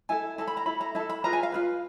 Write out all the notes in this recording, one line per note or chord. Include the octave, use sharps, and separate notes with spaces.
E4 A4 G#5
E4 A4 A5
B5
A#5
E4 A4 B5
A#5
E4 A4 A5
B5
F4 G#4 B4 A#5
G#5
F5
F4 G#4 B4